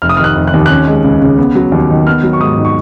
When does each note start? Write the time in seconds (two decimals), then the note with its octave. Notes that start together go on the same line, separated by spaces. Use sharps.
0.02 F1 F6
0.09 D#6
0.17 D#3 F6
0.24 F#6
0.35 F1
0.47 F#6
0.53 D#2
0.66 C#4 F#6
0.88 G#3
1.04 C#2
1.22 C#3
1.38 B3
1.55 F#3
1.72 D#2
1.90 D#3
2.06 B3 F6
2.23 F#3
2.33 C#6
2.40 G#2 D#6
2.58 D#3
2.65 C#6